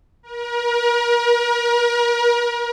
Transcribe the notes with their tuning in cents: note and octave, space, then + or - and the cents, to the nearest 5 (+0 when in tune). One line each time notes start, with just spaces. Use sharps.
A#4 +40